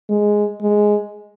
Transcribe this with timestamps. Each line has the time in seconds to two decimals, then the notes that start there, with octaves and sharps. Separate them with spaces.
0.09 G#3
0.62 G#3